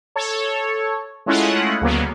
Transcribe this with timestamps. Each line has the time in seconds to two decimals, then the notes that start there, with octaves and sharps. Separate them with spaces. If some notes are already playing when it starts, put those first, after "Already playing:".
0.16 A4 C#5
1.26 G#3 A3 C#4 E4 F4 F#5
1.81 D2 C#3 F#3 A#3 B3